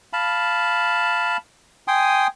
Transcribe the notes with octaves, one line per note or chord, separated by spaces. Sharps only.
F5 A5 B5
G5 G#5 C6 D#6